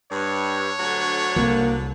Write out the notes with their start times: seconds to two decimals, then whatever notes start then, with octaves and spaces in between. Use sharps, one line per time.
0.12 G2 C#5
0.80 D2 D3 F#3
1.36 C2 A#3